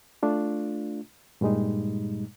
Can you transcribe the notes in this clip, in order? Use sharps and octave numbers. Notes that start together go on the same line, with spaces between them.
A3 D4 F4
G2 A#2 G3 G#3 D#4